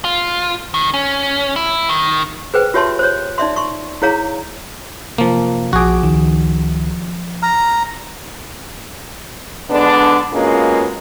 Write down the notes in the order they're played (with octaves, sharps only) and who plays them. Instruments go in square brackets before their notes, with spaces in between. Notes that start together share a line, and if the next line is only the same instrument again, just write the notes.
[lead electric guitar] F4
D#3
C#4
E4
D#3
[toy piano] G#4 B4 C5 G5
F4 G4 C#5 E5 A5 C6
C5 C#5
D#4 D5 E5 C6
C6 C#6
E4 G#4 C#5 F5 A#5
[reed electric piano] F#2 C3 [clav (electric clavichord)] F3 A#3
[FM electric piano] A#1 D6 [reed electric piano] F3 [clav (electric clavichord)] F#4 G#4
[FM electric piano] C#2 D#3
[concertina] A#5 [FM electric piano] F6
[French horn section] D3 G#3 B3 D4
B2 G#3 A#3 C#4 F4